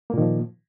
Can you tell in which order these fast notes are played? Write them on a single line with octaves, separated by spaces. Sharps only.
A#3 A#2 D#3 F3